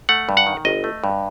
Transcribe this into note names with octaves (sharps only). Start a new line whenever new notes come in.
A3 F#5
G2
F#5
D#3
G1 D#5
A3
G2